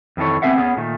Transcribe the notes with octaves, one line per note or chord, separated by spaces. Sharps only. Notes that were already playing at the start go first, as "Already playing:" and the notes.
F2 D#3 E3 A4 C#5
B3 C4 G4 G#4 E5 F#5
B3 C#4 G#4
A#2 D#3 A3